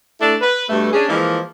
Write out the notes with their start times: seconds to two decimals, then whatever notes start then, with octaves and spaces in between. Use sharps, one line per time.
0.20 A3 D4 E4 A4
0.41 B4
0.69 G2 B2 A3
0.93 C#4 D4 G#4
1.08 E3 F3 G#3 A#3